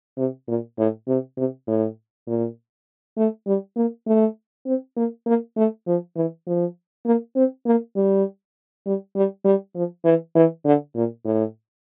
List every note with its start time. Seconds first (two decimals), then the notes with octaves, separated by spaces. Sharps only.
0.18 C3
0.48 A#2
0.78 A2
1.08 C3
1.37 C3
1.67 A2
2.27 A#2
3.18 A3
3.47 G3
3.76 A#3
4.07 A3
4.66 C4
4.97 A#3
5.27 A#3
5.57 A3
5.87 F3
6.16 E3
6.47 F3
7.06 A#3
7.36 C4
7.66 A#3
7.96 G3
8.86 G3
9.16 G3
9.45 G3
9.76 F3
10.05 E3
10.35 E3
10.65 D3
10.96 A#2
11.26 A2